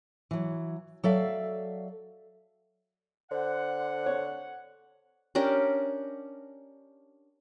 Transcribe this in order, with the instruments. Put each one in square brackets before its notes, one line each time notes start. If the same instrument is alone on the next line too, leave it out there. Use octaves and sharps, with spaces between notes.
[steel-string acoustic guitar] E3 F#3
F#3 A4 D5 E5 F5
[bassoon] D3 [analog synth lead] C5 [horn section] F#5
[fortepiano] C#5
[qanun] C#4 D4 G4 A#4